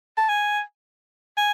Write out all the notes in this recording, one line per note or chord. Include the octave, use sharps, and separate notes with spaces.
A5
G#5
G#5